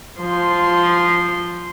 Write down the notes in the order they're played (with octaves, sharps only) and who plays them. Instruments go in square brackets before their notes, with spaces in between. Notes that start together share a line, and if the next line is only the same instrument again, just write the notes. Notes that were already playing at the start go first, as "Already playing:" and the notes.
[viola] F3 C6